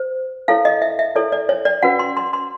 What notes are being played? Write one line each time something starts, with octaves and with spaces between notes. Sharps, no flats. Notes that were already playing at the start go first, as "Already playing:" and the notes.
Already playing: C5
E4 A4 C#5 F5
D#5
E5
E5
E4 A4 C#5 D5
D5
C#5
D5
C#4 F#4 B4 F#5
C6
C6
C6